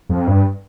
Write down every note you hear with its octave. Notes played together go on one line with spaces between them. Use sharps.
F2
G2